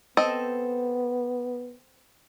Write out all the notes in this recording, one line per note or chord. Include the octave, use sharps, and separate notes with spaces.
B3 C4 A4 D#5